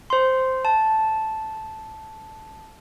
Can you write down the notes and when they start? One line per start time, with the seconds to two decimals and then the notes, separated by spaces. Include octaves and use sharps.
0.10 C5 C6
0.65 A5